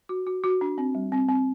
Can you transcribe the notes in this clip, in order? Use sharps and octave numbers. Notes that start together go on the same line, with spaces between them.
F#4
F#4
F#4
D4
C4
G3
C4
C4